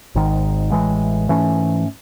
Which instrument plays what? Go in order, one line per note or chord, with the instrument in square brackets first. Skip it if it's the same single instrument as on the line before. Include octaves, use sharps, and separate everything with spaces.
[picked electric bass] G#1 G#2 D#3
A1 A2 E3 G#3
G#2 E3 A3 C#4